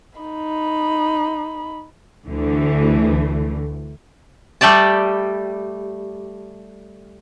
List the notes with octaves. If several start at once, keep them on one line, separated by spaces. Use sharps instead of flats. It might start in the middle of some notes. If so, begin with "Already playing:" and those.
D#4 B5
D2 D3 E3 A3
G3 A3 G4 D5 A5